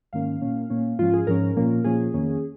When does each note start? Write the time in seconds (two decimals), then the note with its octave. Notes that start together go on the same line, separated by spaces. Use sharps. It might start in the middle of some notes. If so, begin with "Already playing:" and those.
0.13 G#2 D#3 A#3 C#4 F5
0.42 A#2 A#3 C#4
0.70 A#2 A#3 C#4
0.99 G#2 F3 C#4 F4
1.13 G#4
1.27 G#2 F3 C#4 A#4
1.57 A#2 F3 A#3 C#4
1.84 A#2 F3 A#3 C#4 G#4
2.14 F2 D#3 A#3 C#4